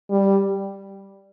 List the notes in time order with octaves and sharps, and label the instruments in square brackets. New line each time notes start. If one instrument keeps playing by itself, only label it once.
[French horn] G3